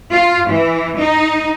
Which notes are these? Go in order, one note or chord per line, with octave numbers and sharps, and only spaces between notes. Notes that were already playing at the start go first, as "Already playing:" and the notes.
F4
E3
D#4